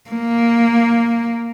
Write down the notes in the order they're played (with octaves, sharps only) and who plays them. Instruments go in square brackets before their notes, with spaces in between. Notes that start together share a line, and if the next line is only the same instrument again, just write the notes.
[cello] A#3